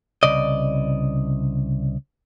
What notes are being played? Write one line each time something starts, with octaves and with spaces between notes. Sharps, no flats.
C2 C#3 D5 D#5